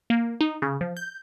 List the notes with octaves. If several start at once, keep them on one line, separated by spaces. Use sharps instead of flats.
A#3
D#4
C#3
F3
G6